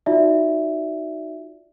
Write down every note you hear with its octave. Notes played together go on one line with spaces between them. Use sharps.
D#4 F4 F#4 D5 E5